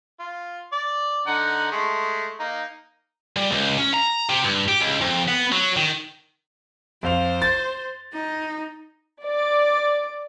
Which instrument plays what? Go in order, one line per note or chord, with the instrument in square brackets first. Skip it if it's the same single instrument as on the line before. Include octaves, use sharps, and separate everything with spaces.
[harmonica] F4
D5
D3 D#4 F#5
G#3 A3
A#3 D#4
[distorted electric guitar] G3
C#2
C#4
A#5
C3
G2
G4
C#2
F2
B3
F#3
D#3
[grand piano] F2 F5 F7 [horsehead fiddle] C5
[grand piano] A6
[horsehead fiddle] D#4
[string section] D5